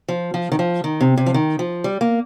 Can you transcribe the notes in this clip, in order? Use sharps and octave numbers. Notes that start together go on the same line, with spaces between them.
F3
F3
D#3
F3
D#3
C3
C3
F3
D#3
F3
G3
A#3